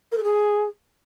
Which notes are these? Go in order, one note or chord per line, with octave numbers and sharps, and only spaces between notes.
A#4
A4
G#4